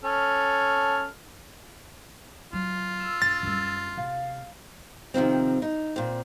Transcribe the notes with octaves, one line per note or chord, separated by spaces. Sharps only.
C#4 A4 F6
F#3 F4
E6
F#2 A6
F#2 G3
C3 F5
C3 D#3 F3 C4
D#4
A#2 C4